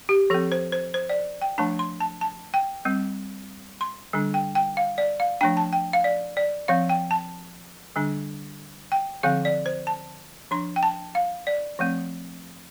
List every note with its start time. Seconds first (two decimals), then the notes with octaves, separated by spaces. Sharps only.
0.09 G4
0.30 F3 C4 A4
0.52 C5
0.72 C5
0.94 C5
1.09 D5
1.42 G5
1.58 F3 A3 D4 A5
1.79 C6
2.00 A5
2.21 A5
2.54 G5
2.85 G3 C4
3.81 C6
4.13 D3 G3 D4
4.34 G5
4.55 G5
4.77 F5
4.98 D5
5.20 F5
5.41 F3 A3 D4 G5
5.57 A5
5.73 G5
5.93 F5
6.04 D5
6.37 D5
6.68 F3 C4 F5
6.90 G5
7.11 A5
7.96 D3 G3 D4
8.92 G5
9.23 D3 F3 C4 F5
9.45 D5
9.66 C5
9.87 A5
10.51 F3 D4 C6
10.76 G5
10.83 A5
11.15 F5
11.47 D5
11.79 F3 A3 C4